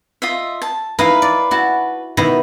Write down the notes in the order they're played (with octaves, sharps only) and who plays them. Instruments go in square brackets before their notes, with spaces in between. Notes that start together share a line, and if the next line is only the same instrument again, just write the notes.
[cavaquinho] F4 D#5 E5
A5
[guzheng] D#4 E4 A#4 [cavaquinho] B4 F5
[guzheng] D5
E4 F#4 A5
B2 D#3 E4